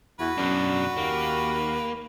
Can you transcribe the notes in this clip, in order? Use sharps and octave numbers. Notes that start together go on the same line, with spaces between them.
E2 F#4 B4
F#2 B2 D4
D#2 A#3